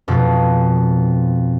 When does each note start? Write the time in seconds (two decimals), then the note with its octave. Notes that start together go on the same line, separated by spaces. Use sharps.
0.08 F2 B2 F3